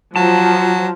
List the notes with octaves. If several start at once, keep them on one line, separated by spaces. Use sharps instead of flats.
F3 F#3 A5